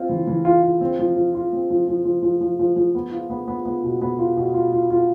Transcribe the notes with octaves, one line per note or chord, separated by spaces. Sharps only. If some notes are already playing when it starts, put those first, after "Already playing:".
Already playing: C4 F4
E3
E3
F4
F4
C4
F3
F3
F4
C4
F3
F3
F3
F3
F3
F3
F3
B3
F4
B3
B3
B3
B2
B3
F4
B2
F4
F4
F4